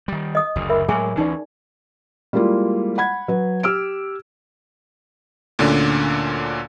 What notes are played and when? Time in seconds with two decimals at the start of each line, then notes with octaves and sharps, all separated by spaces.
0.08 D#3 G3
0.35 D#5 D#6
0.56 F#1 D2
0.70 A#4 E5 B5
0.88 A2 F#3 G#3 G#4 G#5 C#6
1.17 D2 E3 C#4 D#4 D5
2.33 G3 G#3 A#3 E4 F4
2.98 F#5 B5 G#6
3.28 F#3 B4
3.63 G4 E6 F6 D7
5.59 D2 A#2 D3 C#4 D4